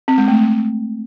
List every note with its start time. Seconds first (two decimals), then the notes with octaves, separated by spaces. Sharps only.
0.08 C4
0.18 G#3
0.28 A3